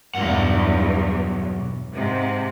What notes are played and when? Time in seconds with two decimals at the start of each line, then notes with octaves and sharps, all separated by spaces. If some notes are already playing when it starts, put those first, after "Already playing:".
0.15 B1 E2 G2 F#5
1.92 G#2 C3